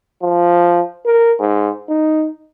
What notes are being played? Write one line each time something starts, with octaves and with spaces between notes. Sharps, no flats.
F3
A#4
G#2
D#4